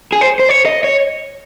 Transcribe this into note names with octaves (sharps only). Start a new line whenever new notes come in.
G#4
C5
C5
C#5
D#5
C#5